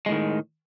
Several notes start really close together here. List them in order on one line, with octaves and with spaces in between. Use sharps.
G#3 A2 D#3